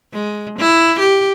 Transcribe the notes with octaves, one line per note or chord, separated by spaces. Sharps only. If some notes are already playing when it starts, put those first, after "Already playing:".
G#3
E4
G4